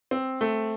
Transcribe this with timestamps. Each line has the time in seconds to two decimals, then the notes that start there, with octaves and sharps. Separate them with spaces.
0.11 C4
0.41 A3